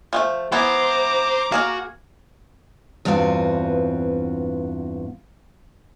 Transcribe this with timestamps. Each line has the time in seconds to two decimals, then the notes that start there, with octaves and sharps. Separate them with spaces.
0.13 F3 G#3 A3
0.52 E3 B3 E4 C5 A#5 D6
1.52 A#3 F#4 G#4 A#4
3.05 E2 G2 C4 F4 F#4 B4